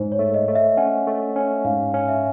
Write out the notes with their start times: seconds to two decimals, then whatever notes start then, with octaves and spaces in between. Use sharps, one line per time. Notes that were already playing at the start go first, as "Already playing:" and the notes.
Already playing: G#2 C5
0.12 C#5
0.19 A3
0.34 D#5
0.48 A3
0.55 E5
0.77 C#4 F#5
1.07 A3
1.36 C#4
1.65 G#2 F5
1.94 C#4
2.08 E5